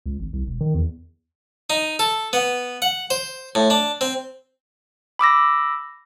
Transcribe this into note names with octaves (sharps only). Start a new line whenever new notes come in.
C#2
G#1
C2
E1
D#3
E2
D#4
A4
B3
F#5
C5
A2
D4
C4
B5 D6 E6 A#6